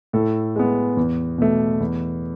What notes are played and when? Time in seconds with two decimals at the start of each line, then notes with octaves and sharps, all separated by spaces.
0.13 A2 A4
0.56 G#3 B3
0.97 E2
1.38 B2 A3
1.80 E2